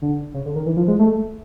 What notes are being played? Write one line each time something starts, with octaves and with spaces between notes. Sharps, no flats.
D3
C#3
D3
D#3
E3
F3
G#3
A3